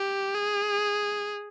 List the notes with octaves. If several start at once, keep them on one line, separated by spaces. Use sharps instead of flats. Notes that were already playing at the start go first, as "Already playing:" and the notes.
Already playing: G4
G#4